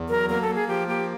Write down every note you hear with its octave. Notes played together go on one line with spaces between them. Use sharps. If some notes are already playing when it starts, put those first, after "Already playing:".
Already playing: E2
F#3 A#4
A#3 A#4
A4
A#3
G#4
F3 G4
A#3 G4